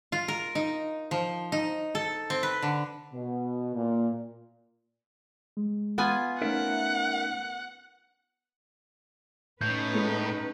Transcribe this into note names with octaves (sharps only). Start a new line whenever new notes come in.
F4
A#4
D#4
F3
D#4
A4
C4
B4
D3
B2
A#2
G#3
B3 F4 G#5
A3 C#4 D#4 A#4 E5 F#5
A2 C#4 D#4 B4 G6
G#3 A3